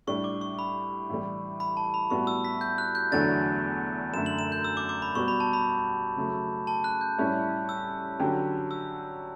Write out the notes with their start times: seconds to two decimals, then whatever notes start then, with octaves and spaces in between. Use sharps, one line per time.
0.07 A2 G3 D4 C#6
0.24 D6
0.41 C#6
0.59 B5
1.09 A2 E3 G3
1.60 B5
1.77 A5
1.94 B5
2.10 A2 G3 B3 F#4 C#6
2.27 E6
2.45 B6
2.61 G6
2.78 F#6
2.95 G6
3.12 E2 D3 F#3 A3 D4 A6
4.13 F#2 E7
4.16 D3 A3
4.26 F#7
4.39 E7
4.52 G6
4.64 E6
4.77 D6
4.89 D6
5.02 B5
5.15 B2 G3 B3 F#4 C#6
5.28 B5
5.40 A5
5.53 B5
6.16 C#3 F#3 A3
6.67 A5
6.84 F#6
7.01 G6
7.18 A2 G3 C#4 E4
7.69 E6
8.19 D3 F#3 C#4 G4
8.71 E6